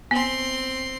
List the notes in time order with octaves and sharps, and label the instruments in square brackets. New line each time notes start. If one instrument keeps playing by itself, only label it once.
[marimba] B3 [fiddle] C4 C6